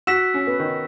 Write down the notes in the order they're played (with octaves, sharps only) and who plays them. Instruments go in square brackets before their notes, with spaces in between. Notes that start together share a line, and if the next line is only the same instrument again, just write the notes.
[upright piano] F#4 [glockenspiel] E6 B6 E7
[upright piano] C#4
B3
D#3